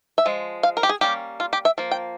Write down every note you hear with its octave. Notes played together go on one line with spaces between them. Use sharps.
E5
F3 G#3
F5
A#4
G4
G#4
G3 A#3 C#4 G4
F4
G4
E5
F3 A#3
G5